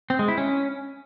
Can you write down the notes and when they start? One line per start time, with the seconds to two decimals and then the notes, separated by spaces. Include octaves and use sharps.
0.10 C4
0.19 G#3
0.28 E4
0.38 C#4